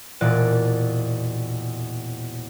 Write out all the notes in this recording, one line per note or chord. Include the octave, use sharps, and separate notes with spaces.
E1 A#2 D5 F#6